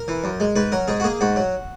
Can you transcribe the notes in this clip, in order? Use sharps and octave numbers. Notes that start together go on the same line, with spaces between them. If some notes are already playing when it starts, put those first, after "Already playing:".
Already playing: A#4
E3
F#2
G#3
G#2 B4
F#3 A#4
G#2 G#4
F#4
A#3 G#4
G#2 F#4
F#3